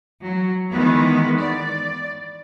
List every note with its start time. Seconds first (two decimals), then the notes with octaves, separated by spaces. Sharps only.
0.23 F#3
0.70 D#3 E3 G#3 B3
1.39 D5